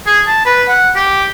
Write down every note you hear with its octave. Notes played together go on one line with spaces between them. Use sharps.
G#4
A5
B4
F#5
G4